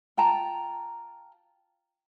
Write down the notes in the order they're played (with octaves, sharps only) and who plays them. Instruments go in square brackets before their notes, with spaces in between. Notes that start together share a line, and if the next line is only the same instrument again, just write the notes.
[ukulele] F4 G5 A5 A#5